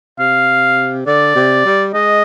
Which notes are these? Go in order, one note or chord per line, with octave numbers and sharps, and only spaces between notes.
C3 F5
D3 D5
C3
G3
G#3 D#5